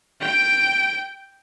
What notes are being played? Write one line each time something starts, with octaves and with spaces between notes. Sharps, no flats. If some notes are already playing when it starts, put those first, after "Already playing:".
G5 D7